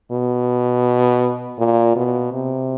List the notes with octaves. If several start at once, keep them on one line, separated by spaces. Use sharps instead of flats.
B2
A#2
B2
C3